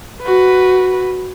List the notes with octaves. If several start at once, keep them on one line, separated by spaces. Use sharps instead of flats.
F#4 B4